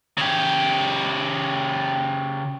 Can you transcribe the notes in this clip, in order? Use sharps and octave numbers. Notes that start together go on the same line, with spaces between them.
C#3 G4